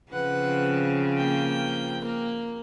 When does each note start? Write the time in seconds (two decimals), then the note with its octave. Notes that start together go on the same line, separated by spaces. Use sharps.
0.12 C#3 F3 C4 B4 F#5
1.17 A#3 G5
2.02 A#3 A#4